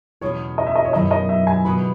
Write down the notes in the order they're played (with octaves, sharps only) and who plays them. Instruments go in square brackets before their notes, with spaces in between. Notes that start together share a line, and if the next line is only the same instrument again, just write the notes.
[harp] E2 B2 G#3 C#4 [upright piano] C#5
[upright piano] D#5
E5
D#5
C#5
[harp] F#2 D#3 F#3 B3 E4 [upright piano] D#5
[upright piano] D#5
E5
G#5
[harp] B2 G#3 B3 F#4 B4 [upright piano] B5